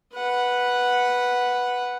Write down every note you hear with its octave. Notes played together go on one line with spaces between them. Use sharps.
B4 F#5